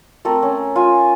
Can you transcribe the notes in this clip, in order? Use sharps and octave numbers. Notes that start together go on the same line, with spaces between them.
A3 C4 A4 A#4
C#4
F4 G#5